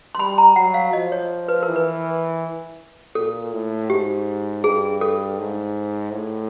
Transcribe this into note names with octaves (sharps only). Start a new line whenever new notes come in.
C6
G3 B5
A#5
F#3 F#5
F5
F3 D#5
C#5
B4
E3 A#4
B4
A#2 A4
A2
G#2 G4
G2 G#4
A4
G#2
A2